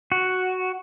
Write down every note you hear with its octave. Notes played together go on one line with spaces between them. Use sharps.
F#4